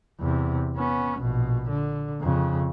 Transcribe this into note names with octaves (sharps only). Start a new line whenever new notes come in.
E2 C3
B3 C#4
A#1 B2
D3
F2 C#3